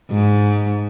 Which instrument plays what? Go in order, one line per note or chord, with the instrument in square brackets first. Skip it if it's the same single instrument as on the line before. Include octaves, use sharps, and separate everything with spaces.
[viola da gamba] G#2